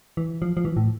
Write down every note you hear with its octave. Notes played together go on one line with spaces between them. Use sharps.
E3
F3
F3
E3
A2